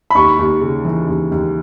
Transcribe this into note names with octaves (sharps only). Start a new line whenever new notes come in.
B5
D#2 C#6
D#2
C#3
E3
D#2
D#2